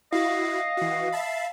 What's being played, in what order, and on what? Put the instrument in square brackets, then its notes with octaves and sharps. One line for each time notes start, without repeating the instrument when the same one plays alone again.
[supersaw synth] E4 F#4 [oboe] D#5 [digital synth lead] F5
[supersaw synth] E3 F#4
E5 A5 B5